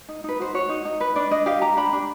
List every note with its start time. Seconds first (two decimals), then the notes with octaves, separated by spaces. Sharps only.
0.09 D#4
0.24 D#4 B4
0.39 F#4 C5
0.54 F#4 C#5
0.69 D#4
0.85 D#4
1.00 B4
1.16 D4 D5
1.31 D4 D#5
1.46 G4 F5
1.62 G4 A#5
1.77 D4 B5
1.93 D4